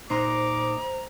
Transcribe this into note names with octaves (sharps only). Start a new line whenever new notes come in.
A#2 D#4 C5 A#5 C6 D6